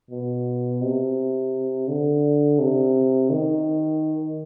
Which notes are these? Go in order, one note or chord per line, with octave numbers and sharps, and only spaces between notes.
B2
C3
D3
C3
D#3